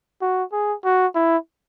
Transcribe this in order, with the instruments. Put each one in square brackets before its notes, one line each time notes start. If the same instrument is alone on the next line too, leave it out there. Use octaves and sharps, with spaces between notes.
[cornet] F#4
G#4
F#4
E4